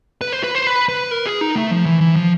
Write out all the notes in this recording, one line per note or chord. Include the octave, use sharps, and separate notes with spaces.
B4
C5
B4
C5
B4
B4
A#4
G#4
D#4
A3
F3
E3
E3
F3